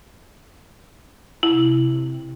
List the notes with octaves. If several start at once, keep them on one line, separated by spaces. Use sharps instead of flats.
C3 E4